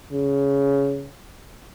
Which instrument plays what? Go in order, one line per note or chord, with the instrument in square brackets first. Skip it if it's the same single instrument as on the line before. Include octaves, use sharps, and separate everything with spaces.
[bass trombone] C#3